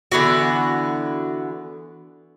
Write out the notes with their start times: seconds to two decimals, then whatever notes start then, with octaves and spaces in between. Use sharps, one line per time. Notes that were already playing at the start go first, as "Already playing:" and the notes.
0.12 D3 E3 B3 F#4